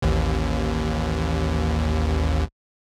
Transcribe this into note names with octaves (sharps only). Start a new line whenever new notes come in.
A1 D#2